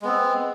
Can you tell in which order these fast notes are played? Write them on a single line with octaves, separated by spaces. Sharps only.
G#3 B3 C4